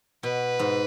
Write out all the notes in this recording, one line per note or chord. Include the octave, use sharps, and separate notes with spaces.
B2 B4
G#2